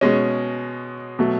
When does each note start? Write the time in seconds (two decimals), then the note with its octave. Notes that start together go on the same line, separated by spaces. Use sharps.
0.01 B2 G#3 C#4
1.19 B2 F#3 A3